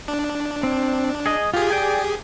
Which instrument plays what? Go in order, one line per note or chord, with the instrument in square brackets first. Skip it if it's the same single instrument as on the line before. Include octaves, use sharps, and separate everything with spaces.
[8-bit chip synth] D4
[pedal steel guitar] C4
G#4 D#5
[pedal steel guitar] F4 [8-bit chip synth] G4 G#4
[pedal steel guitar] D5 G5 G#5